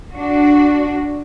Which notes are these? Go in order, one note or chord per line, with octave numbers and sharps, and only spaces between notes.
D4 F#4